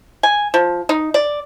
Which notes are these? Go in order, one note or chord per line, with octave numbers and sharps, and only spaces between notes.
G#5
F3
D#4
D5